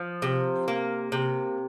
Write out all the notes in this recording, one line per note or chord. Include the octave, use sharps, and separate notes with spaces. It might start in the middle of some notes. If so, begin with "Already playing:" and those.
Already playing: F3
C3
A#3
C3